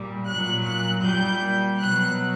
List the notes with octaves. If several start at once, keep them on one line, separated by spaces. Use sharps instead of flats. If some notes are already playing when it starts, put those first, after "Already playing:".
Already playing: A#2 G3
A#2 F#3 F#6
F#6
A#2 G3 G6
B2 F#3 F#6